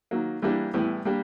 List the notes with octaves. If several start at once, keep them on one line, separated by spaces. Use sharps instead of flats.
D#3 F#3 A#3
E3 G3 A#3 D4 G4
A2 E3 G3 B3
G3 A#3 D4 G4